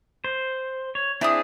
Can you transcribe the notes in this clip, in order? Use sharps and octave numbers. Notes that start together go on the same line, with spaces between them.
C5
C#5
C4 D4 E4 G#4 D5 D#6